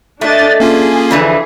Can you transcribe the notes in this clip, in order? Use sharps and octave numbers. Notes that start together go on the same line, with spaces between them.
A3 D4 D#5 A6
A#3 C#4 F4 G#4
F2 D3 E3